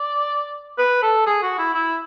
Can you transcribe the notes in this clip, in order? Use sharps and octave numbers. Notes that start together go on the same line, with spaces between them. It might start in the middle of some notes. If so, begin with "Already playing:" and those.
Already playing: D5
B4
A4
G#4
F#4
E4
E4